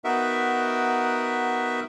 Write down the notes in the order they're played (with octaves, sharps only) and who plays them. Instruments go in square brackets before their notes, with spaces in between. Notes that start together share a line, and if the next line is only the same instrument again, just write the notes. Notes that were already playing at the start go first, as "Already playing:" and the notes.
[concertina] B3 D#4 F#4 A#4 E5